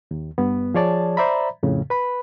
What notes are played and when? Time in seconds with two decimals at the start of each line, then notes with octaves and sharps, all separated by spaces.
0.11 D#2
0.38 G2 B3
0.74 F3 G#4 C#5 D5 A5
1.17 C5 D5 E5 A#5 B5
1.63 F2 A2 C#3
1.90 B4 B5